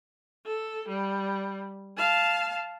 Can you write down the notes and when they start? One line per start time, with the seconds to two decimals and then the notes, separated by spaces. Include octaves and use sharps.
0.46 A4
0.88 G3
1.97 F5 A5